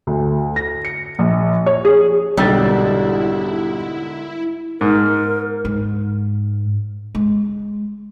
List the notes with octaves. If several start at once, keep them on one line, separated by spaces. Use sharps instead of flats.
D2
A#6
C#7
A#1
C#5
G#4
B1 G#2 D3 G3 A#3 E4 E6 A6
G#2 A#4
G#2
G#3